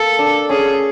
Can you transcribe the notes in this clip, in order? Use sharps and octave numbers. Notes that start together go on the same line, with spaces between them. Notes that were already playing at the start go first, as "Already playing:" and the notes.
Already playing: A#3 A4
D4
C#4 G#4